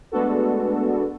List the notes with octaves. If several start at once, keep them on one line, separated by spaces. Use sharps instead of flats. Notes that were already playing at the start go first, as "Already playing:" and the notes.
G#3 A3 B3 D4 F#4 A4